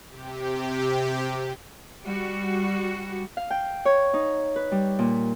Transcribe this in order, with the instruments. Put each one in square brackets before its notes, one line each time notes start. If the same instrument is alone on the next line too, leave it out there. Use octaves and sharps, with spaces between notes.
[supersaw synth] C3 G4
[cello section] G3 F#4
[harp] F5
G5
C#5
D#4
B4
G3
A#2